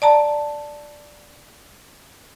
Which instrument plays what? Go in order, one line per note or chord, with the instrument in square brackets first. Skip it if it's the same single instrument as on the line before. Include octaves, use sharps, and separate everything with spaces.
[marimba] D5 A5 A#5